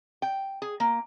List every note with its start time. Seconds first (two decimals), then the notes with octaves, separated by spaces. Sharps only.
0.22 G5
0.62 G#4
0.80 A#3